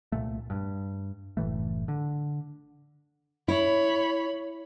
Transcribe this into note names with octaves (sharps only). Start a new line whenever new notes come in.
C2 A#2 A3
G2
F#1 A2 E3 A3
D3
E4 C#5 B5